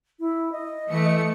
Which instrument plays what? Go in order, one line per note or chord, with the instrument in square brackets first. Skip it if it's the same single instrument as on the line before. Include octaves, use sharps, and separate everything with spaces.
[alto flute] E4
D#5
[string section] E3 A3 C#7